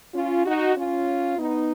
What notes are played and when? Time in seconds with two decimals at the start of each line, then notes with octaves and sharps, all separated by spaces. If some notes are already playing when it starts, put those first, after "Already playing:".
0.15 C#4 F4
0.46 D#4 F#4
0.76 C#4 F4
1.39 B3 D#4